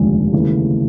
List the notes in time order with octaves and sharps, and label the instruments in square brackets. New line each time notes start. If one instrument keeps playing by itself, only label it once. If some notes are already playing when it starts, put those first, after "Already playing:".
Already playing: [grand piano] F1 D#2 D3 F3 [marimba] G#3
[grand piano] D#2 C#3 E3 A3